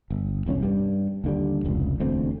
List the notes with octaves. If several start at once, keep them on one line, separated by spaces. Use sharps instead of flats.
G1
E1 C2 C4 C#4
G2 G3
D#2 D3 G3
F1 C#2
E1 D2 D3 C4